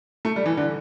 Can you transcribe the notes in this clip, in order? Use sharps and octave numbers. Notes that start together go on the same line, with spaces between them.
A3
G3
E3
D3